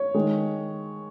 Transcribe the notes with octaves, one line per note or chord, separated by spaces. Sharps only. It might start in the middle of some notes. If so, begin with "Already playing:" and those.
Already playing: C#5
D#3 G#3